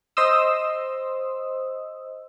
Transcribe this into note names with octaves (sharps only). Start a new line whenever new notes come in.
C5 D#5 C6 D#6 E6